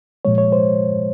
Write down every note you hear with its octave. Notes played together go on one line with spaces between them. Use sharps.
A#2 F3 G#3 C#5
C#5
C5